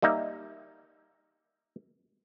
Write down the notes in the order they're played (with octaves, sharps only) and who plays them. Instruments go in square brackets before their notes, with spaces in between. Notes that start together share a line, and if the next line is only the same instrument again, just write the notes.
[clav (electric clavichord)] G3 A#3 D#4 E5